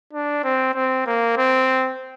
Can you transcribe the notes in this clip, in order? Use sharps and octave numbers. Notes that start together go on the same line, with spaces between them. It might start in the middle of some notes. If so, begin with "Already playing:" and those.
D4
C4
C4
A#3
C4